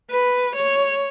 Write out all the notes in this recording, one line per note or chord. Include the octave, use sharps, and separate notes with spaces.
B4
C#5